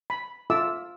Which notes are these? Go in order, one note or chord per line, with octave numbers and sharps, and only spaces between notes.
B5
F4 A4 E5 A5 D6 E6